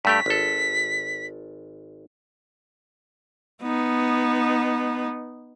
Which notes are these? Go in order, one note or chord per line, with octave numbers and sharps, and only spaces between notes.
G2 A3 G4 B6
G#1 A4
B3 D#4